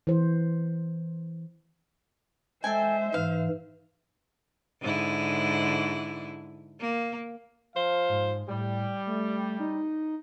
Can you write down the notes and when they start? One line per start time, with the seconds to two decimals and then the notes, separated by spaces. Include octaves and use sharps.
0.07 E3 C5
2.64 G#3 A4 C5 E5 G5 G#5
3.14 G#2 E3 F5
4.82 G#2 D3 E4
6.81 A#3
7.75 F3 C5 F5
8.09 G#2
8.48 A2 G3
9.06 A3
9.60 D#4